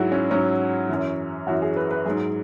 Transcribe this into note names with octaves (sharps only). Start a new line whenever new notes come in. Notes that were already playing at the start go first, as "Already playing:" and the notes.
Already playing: G#2 F#3 E4 F#4 G#4
C#4
G#2 F#3 C#4
F#2 E3
F#2 E3 F#4
G#4
B4
B4
G#2 F#3 G#4